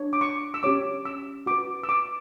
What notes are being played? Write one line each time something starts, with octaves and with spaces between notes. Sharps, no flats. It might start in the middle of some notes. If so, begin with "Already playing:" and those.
Already playing: D4 C#5
D6
C#6
E6
C#4 G4 C#5 D6
E6
F#4 B4 D6
E6
D6